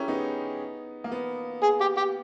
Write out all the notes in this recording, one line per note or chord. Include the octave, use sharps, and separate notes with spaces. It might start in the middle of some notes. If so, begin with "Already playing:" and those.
Already playing: C#4 E4 G4 G#4 A#4
B3 D#4
A#3
B3
G#4
G4
G4